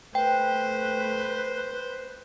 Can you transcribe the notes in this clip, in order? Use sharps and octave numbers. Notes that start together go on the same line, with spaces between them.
A3 B4 C5 G5